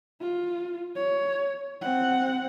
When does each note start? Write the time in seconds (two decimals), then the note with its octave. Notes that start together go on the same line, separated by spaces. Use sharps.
0.20 F4
0.96 C#5
1.81 C4 F#5